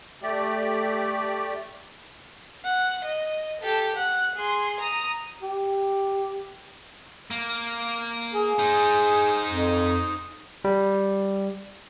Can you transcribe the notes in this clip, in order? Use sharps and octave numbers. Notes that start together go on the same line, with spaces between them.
A3 G4 D5
F#5
D#5
G4 A4
F#5 F#6
G#4 C6
A#5 D#6
G4
A#3
G#4
D#4 C5
F2
G3